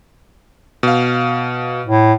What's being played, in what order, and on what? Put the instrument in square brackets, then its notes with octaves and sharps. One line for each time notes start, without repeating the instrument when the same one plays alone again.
[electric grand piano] B2 F5
[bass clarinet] A2